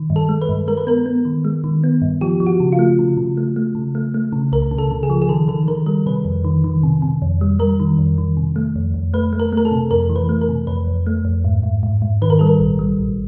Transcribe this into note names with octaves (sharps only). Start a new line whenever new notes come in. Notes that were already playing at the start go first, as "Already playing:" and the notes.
Already playing: D#3
G2
A4
G#3
B4
G2
G#3 A#4
B4
B3 A#4
B3
D#3
G#3
D#3
B3
G2
F3 G4
F3
F#4
C#3
F4
A3
C#3
C#3
A3
A3
C#3
A3
A3
C#3
C#2 A#4
C#3
A4
C#3
G#4
F3
G#4
D#3 A4
D#3 A4
D#3 A#4
G3 A#4
C3 B4
F2
D#3
D#3
C3
C3
F2
G3
G3 A#4
D#3
F2
D#3
C3
A3
F2
F2
A3 B4
A3
A#4
A3 A#4
A4
C3
F2 A#4
E3
B4
A3
A#4
C3
F2 B4
F2
A3
F2
G#2
G#2
G#2
G#2
D#3 B4
A#4
G3 A4
A#4
A#1
G3
A#1